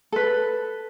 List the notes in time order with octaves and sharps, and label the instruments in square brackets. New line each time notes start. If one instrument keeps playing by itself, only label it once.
[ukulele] A4 B4